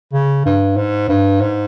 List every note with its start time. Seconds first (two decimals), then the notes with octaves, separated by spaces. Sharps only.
0.13 C#3
0.46 G2
0.77 G#2
1.09 G2
1.41 G#2